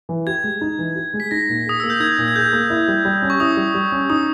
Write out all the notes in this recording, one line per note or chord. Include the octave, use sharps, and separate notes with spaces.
E3
G4 G#6
G#3
D#4
E3
G4
G#3
B6
D#4 A#6
A#2
G#4 D#6
A#3 E6
G6
D#4 G#6
A#2
G#6
G#4 G6
A#3
E4
G3
G3
C#4
C#6
E4 D#6
G3
G3
C#4
D#4 D#6